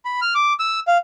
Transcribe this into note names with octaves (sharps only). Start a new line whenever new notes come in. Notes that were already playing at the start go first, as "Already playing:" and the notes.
B5
F6
D6
E6
F5